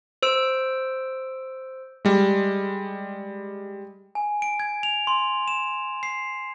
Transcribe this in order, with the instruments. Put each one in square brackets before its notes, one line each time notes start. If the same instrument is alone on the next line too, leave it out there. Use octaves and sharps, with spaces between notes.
[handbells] C5 E6 D7
[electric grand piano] G3 G#3
[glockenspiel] G#5
D7
G#6
F7
C6
E7
C7